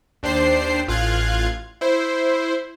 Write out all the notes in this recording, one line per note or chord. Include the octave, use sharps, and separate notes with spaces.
D#2 D4 G4 C5 C7
A1 F4 F5 F#6 G#6
E4 C5